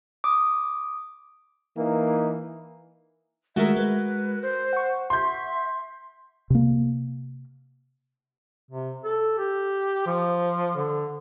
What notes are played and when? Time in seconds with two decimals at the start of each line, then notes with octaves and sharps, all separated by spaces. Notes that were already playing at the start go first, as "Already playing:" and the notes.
0.24 D6 D#6
1.76 E3 A#3 D#4
3.56 D#3 G#3 A3 F#4 A#4 E5
3.76 G#3 B4
4.42 C5
4.73 F#5 C#6
5.10 E5 C6 G6
6.50 C3 A#3
8.71 C3
9.04 A4
9.38 G4
10.06 F3
10.76 D3